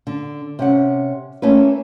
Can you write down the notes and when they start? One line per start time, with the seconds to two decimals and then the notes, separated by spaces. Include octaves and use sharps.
0.07 D3
0.59 C3 C#4 F#5
1.42 A3 A#3 C#4 E4 B4